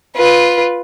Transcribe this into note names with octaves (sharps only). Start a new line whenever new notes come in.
F4 B4